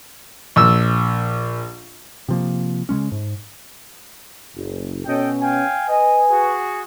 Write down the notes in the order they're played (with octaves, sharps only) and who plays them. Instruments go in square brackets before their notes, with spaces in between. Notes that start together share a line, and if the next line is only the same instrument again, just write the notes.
[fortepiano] A#1 E6
[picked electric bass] C3 F3 A#3
C#3 E3 G#3 C#4
G#2
[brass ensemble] F#1
[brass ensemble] B2 C#4 [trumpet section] A4 D#5 G5
[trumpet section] F5 G5 G#5
[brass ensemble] B4 G#5 [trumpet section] D#5
[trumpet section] F#4 G#4